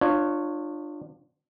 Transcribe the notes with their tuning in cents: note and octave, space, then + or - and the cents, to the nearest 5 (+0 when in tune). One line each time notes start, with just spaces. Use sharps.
D4 +30 F4 +0 C#5 -5